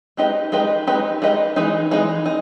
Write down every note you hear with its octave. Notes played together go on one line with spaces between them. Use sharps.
G#3 D#4 G4 B4 D#5
G#3 D#4 G4 B4 D#5
G#3 D#4 G4 B4 D#5
G#3 D#4 G4 B4 D#5
E3 G#3 D#4
E3 G#3 D#4
D#4